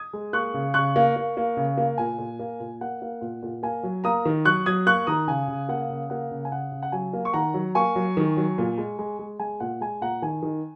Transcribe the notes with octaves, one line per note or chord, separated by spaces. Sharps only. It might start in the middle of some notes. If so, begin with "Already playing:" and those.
Already playing: D#6 G#6
G#3
A#3 C#6 F#6
C#3
C#3 C#6 F#6
A#3
A#3
A#3
C#3
A#3
A#2 G#5
A#2
A#3
A#2
A#3 F#5
A#3
A#2
A#2
A#3 G#5
F#3
A#3 A#5 D#6
D#3
F#3 C#6 F#6
F#3 D#6 G#6
A#3 C#6 F#6
D#3 A#5 D#6
C#3 G#5
C#3
A#3 F#5
C#3
A#3 F#5
C#3
G#5
C#3 F#5
C#3
F#5
F#3 G#5
A#3
C#6
D#3 F#5 A#5
F#3
A#3 G#5 C#6
F#3
D#3
F#3
A#2
G#3
G#3
G#3
G#3 G#5
A#2 F#5
G#3 G#5
A#2 F#5 A#5
D#3 G#5
D#3